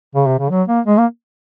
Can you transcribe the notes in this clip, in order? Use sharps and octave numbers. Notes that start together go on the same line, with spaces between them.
C#3
C3
C#3
F#3
A#3
G#3
A#3